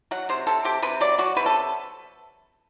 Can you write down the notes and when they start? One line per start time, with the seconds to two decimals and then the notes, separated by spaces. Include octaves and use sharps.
0.11 F#3 F#5
0.29 C3 C5
0.47 C3 A4
0.65 C3 G4
0.82 C3 B4
1.01 F#3 D5
1.18 F#3 F#4
1.36 C3 B4
1.46 A4